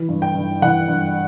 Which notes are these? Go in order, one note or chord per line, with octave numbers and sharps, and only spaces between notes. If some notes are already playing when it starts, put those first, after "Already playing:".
Already playing: E3
G2
G5
G2
E3 F#5
G2